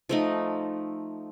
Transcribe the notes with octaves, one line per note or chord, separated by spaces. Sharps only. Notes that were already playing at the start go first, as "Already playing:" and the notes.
F3 A3 D#4